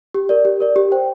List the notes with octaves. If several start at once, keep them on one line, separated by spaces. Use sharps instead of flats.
G4
A#4 D5
G4
A#4 D5
G4
C5 G5